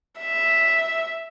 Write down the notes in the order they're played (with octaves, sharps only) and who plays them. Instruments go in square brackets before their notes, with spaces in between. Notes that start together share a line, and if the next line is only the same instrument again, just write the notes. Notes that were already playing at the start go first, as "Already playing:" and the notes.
[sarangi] E5